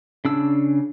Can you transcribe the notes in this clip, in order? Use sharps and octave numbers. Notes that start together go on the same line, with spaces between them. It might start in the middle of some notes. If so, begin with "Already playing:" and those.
C#3 D4 E6